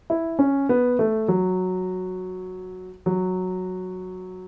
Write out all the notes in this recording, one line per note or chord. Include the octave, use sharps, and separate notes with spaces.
E4
C#4
B3
A3
F#3
F#3